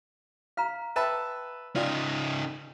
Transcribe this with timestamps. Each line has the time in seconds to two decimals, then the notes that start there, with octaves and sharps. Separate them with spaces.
0.57 F5 A#5 F6
0.96 B4 E5 G5 A5
1.76 C#3 D#4 F4 D5 G5